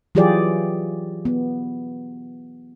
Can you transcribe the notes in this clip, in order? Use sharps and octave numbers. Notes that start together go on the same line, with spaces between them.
E3 F#3 F4 G4 G#4 D5
B3